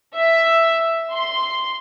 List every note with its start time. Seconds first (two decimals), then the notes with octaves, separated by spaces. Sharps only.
0.16 E5
1.13 C6